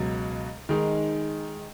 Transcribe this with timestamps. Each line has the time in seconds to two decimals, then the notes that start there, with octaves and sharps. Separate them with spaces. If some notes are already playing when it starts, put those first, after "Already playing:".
Already playing: C#2 B2 F#3
0.69 D#3 G#3 D#4